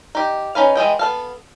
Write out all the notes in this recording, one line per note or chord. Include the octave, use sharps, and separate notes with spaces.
D#4 G4
C#4 D#4 B4 F5
E3 G#3 D#5 G5
B3 A4 F5